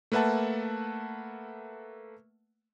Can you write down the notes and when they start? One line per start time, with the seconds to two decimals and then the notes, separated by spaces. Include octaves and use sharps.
0.12 A3 A#3 B4 E5 F#5 A5